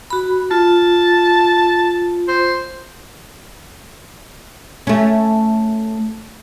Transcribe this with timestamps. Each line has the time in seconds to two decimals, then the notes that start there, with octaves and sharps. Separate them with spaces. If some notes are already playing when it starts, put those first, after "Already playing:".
0.10 F#4 B5
0.51 F4 A5
2.28 C5
4.87 A3 C#4